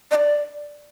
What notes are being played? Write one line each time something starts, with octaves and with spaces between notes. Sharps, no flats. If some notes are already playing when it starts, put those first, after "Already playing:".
D#5
D5